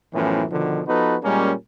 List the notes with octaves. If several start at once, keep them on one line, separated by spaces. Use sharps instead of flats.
F#2 A2 E3 F3 B3 C#4
B2 D3 D#3 F3
F3 B3 D#4 F#4 A4 B4
A#2 G3 G#3 A#3 C#4